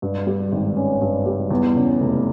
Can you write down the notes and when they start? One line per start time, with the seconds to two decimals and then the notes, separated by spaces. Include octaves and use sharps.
0.02 G2
0.27 G3
0.52 G#1
0.76 C#4
1.01 G2
1.26 G3
1.51 E2
1.75 C#3
2.01 F1